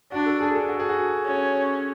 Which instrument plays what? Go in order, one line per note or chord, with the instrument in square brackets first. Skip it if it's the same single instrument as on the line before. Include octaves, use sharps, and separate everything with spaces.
[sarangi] D4 [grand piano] F#4
[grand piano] A4
G#4
A4
F#4
G#4
F#4
[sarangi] C#4